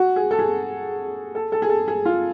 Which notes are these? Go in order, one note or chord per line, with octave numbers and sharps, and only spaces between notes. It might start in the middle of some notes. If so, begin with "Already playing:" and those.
Already playing: F#4
G#4
A4
G#4
A4
A4
G#4
A4
G#4
F4